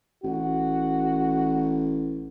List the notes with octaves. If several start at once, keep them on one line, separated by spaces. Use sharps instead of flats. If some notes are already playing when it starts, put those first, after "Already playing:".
A1 F#4